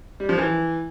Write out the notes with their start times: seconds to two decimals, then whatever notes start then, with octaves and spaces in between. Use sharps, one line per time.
0.20 G3
0.29 F3
0.38 E3